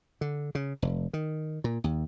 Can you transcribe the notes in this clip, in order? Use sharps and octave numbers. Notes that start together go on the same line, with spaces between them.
D3
C#3
F1
D#3
A#2
D#2